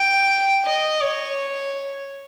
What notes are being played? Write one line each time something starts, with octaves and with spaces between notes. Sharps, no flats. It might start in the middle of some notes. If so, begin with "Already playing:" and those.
Already playing: G5
D#5
C#5